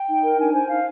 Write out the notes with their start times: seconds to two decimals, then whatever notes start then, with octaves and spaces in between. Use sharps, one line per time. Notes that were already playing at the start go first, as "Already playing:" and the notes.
Already playing: G5
0.08 D#4
0.23 A#4
0.39 D4 G#5
0.54 C5 G#5
0.68 D#4 F5